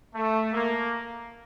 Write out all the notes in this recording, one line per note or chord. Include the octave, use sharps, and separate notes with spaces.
A3
A#3